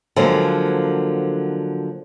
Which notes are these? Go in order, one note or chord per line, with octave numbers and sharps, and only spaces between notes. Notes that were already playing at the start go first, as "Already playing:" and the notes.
D3 F3 F#3 G#3 A#3